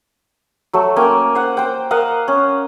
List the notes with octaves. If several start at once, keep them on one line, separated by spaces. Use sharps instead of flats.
F#3 A3
A#3 C#4 G5 G#5
C5 F#5
C5 G5
A#4 D#5 F5 F#5
C#4